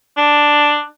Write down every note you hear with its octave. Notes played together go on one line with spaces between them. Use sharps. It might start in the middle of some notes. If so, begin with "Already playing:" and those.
D4